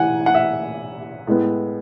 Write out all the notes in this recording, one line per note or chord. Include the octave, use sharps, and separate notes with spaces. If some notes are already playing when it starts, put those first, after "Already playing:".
Already playing: E3 F#5 G#5
F#5
E5
A2 G#3 B3